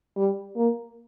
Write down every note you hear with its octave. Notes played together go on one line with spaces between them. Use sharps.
G3
A#3